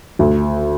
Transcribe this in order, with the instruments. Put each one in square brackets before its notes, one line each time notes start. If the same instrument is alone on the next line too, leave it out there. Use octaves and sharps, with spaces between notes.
[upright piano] D2